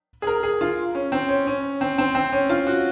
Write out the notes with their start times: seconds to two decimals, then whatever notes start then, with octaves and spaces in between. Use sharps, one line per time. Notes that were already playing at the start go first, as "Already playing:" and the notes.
0.22 G#4
0.27 A#4
0.43 G#4
0.61 F4
0.95 C#4
1.12 C4
1.29 C#4
1.47 C#4
1.81 C4
1.98 C4
2.15 C4
2.33 C#4
2.49 F4
2.67 F#4